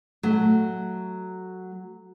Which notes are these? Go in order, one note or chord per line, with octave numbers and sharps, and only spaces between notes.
F#3 A3